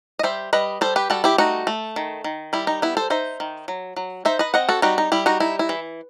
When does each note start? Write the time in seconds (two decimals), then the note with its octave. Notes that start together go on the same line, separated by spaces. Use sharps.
0.19 D#5
0.23 G3 C5 E5
0.53 G3 B4 D#5
0.81 G3 A4 C5
0.96 G4 B4
1.10 G3 F#4 A4
1.24 E4 G4
1.38 A3 D#4 F#4
1.67 A3
1.96 D#3
2.24 D#3
2.53 G3 E4
2.67 D#4
2.82 B3 E4
2.97 A4 C5
3.10 D#4 C5 E5
3.40 D#3
3.68 F#3
3.96 F#3
4.25 D#4 C5 E5
4.39 B4 D#5
4.54 C4 D#5 F#5
4.69 F#4 A4
4.82 G3 D#4 F#4
4.98 D#4
5.12 G3 E4
5.26 D#4 F#4
5.40 D#4 E4
5.59 E4
5.69 E3